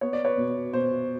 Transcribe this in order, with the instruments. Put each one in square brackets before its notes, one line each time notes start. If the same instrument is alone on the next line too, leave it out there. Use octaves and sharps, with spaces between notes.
[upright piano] B3 C#5
D5
B4 C#5
B2
B2 C5